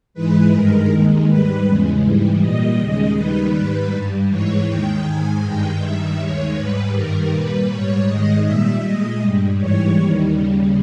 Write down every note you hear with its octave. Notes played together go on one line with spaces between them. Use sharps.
G#2 E3 G#3 B4
G2 D#3 G#3 A#4
D#2 D#3 G#3
G#2 G3 B4
E2 C#3 G#3
G#2 E3 G3
A#2 G3 D#5
D#2 C#3 G#3 D#5
D#2 D#3 G3 B4
G#2 G3 B4
G2 G3
G#2 E3 G#3 C#5
D#2 D#3 G#3 G5
G#2 D#3 G#3 G#5
G2 D#3 G#3 G5
G2 D#3 G3 E5
D#2 D#3 G#3 C#5
G#2 G3 B4
G2 D#3 G3 A#4
A#2 G3 B4
G#2 G3 C#5
G#2 D#3 G#3 D#5
A#2 G3 E5
A#2 G#3 D#5
G2 G3
G#2 E3 G3 C#5
D#2 D#3 G3
D#2 C#3 G3